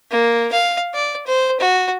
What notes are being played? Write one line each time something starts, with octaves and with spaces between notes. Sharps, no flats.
A#3
F5
D5
C5
F#4